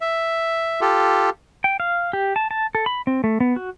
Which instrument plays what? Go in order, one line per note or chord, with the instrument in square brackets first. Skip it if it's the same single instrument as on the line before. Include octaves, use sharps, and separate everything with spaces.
[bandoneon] E5
F4 G4 A4
[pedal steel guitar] G5
F5
G4
A5
A5
A4
B5
C4
A3
B3
F#4